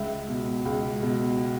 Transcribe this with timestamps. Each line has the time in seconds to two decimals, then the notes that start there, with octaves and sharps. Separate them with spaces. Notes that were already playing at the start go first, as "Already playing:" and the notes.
Already playing: C#2 E5
0.28 B2
0.65 C#2
1.03 B2